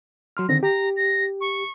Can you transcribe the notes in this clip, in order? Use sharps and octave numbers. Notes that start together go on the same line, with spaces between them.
F#3 C6 F6
D3 D#3 C4 A#6
G4 A#5
A#6
C#6